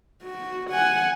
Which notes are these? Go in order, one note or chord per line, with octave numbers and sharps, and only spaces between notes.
F#4
F#5 G#5